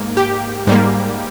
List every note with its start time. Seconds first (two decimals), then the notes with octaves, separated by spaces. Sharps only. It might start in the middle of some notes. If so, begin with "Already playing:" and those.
Already playing: G#2 A#3
0.17 G4
0.67 G#2 G3 A#3